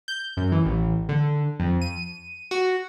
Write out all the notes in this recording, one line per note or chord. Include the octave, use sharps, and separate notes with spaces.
G6
F#2
E3
A1
D3
F2
D#7
F#4